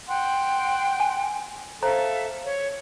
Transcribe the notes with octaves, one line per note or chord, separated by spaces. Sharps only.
F#5 G5 C6
G#5
A4 C5 E5 F5 A#5
C#5